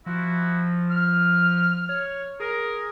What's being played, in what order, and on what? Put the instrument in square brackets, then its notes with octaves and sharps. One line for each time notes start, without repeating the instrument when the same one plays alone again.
[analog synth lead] F3 [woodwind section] E4 F#4
[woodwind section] F6
[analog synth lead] C#5
[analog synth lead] G#4 [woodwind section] A#4